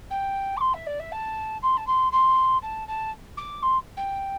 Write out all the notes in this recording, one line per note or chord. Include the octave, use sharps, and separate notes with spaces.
G5
D6
C6
E5
D5
E5
A5
C6
A5
C6
C6
A5
A5
D6
C6
G5